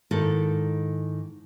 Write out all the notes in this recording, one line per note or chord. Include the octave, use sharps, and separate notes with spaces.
G#2 D#3 E4 A4